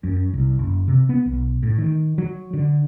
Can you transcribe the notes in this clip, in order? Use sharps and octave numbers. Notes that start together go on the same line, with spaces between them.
F#2
C2
F#1
C3
B3
B1
A2
D#3
F#3
D3